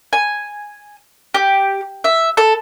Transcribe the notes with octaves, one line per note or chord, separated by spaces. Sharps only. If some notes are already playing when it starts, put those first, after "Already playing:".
G#5
G4
E5
A4